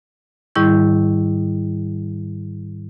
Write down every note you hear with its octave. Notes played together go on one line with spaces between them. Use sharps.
G#2 D#3 G3 E4 C#6 G6